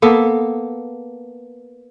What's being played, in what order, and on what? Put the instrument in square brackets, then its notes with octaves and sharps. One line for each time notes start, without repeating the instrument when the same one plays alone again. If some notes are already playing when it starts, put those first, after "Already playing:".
[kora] A#3 B3 A4